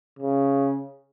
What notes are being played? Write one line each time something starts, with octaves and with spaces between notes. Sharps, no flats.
C#3